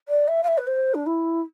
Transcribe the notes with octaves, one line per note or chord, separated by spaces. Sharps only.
D5
E5
F5
E5
B4
C5
D4
E4